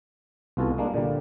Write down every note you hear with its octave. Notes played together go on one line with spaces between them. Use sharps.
C2 B3 F4 F#4 A4 G#5
G#3 A#3 D4
A#2 D3 G3